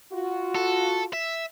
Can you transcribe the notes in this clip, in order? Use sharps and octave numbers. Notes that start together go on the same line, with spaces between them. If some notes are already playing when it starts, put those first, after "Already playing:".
F4 F#4
A4
E5